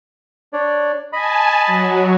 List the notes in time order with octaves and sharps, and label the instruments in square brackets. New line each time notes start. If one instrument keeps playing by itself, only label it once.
[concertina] D4 C#5 D5
[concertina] D#5 B5 [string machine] G#5 A5
[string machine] F#3